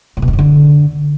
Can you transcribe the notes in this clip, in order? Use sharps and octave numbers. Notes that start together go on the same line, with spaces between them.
A2
B2
F2
F#2
D3